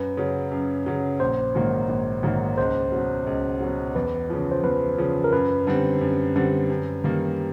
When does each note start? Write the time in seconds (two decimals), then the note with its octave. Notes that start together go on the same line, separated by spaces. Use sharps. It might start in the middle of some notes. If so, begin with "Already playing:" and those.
Already playing: F#2 B4
0.17 C#3 F#3
0.52 F#2
0.86 C#3 F#3
1.20 A#1 C5
1.55 G#2 D#3 F#3 A#3
1.89 A#1
2.23 G#2 D#3 F#3 A#3
2.58 C#2 C5
2.92 B2 F#3
3.27 C#2
3.61 B2 F#3
3.95 E2 B4
4.30 C#3 F3
4.51 C5
4.63 E2 B4
4.98 C#3 F3
5.24 A#4
5.33 F#2 B4
5.67 D3 G3 C4
6.01 F#2
6.36 D3 G3 C4
6.70 F#2
7.04 D#3 G3 A#3